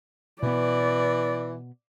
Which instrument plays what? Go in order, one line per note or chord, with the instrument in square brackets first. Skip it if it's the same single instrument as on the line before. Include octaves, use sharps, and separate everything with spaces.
[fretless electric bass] B2 B3 [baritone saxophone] E3 [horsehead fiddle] D5